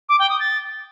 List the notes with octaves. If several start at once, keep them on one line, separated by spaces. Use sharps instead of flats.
D6
G5
D#6
A6